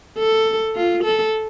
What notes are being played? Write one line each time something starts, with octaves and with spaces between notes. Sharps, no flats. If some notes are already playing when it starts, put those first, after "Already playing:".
A4
F4
A4